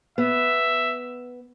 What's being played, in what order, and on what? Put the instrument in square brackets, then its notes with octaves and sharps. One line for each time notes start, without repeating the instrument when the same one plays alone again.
[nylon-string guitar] B3 [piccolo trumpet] E5